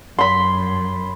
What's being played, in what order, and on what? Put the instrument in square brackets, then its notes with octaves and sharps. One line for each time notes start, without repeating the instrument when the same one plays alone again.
[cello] F#2 [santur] B5 C6